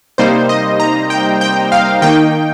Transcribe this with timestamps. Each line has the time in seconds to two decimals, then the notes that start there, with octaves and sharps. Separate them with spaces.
0.18 C3 G3 A#3 D#4 C5
0.49 D#5
0.80 A#5
1.10 G5
1.41 G5
1.72 F5
2.02 D#3 A#3 D#4 G5